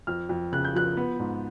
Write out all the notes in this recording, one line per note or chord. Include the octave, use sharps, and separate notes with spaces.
F2 F6
F2
C#3 F#6
G6
F3 F#6
B3
G#2